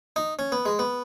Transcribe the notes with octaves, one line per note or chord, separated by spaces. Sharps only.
D#4
C#4
B3
G#3
B3